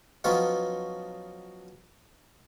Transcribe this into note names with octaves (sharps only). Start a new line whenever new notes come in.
F3 F#3 B3 C#4 D#4 F4